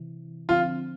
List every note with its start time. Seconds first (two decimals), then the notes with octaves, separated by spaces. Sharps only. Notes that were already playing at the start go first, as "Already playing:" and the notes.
Already playing: C3 E3
0.49 D3 F3 C4 F4